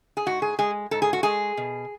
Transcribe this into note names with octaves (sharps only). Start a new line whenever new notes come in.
G#4
G#2 F#4
G#4
G#3 G#4
G#2 A4
G#4
F#4
G#3 G#4
B2